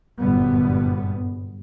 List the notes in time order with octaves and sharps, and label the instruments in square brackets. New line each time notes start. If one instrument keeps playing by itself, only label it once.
[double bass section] G1 F#2 A#2 D3 G3 B3